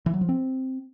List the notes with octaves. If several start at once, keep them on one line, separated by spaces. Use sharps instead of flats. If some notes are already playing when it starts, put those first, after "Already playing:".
E3
F#3
F3
C4